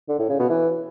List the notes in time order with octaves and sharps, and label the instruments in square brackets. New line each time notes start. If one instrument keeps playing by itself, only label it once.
[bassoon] D3
A2
C#3
B2
E3